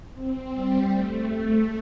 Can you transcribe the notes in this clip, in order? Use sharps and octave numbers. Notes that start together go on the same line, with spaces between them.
C4
G3
A3